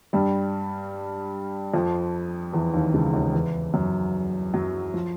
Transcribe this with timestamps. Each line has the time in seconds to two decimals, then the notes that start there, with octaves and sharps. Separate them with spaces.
0.13 G2 G3
1.74 F2 F3
2.53 E2 E3
2.74 D#2 D#3
2.94 C#2 C#3
3.14 D#2 D#3
3.33 E2 E3
3.74 F#2 F#3
4.54 F#2 F#3
4.94 F3